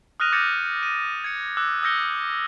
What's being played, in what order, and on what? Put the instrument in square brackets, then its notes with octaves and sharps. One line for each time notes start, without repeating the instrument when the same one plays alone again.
[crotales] D#6 F6 F#6 A#6 D#7 F7
D6 G6 A6 A#6 C#7 D#7
D#7
G#6 C#7
D6 E6 F#6
D#6 E6 G6 A#6 C#7 G7